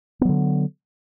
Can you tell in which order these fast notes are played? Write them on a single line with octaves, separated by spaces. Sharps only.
B3 F#3 D3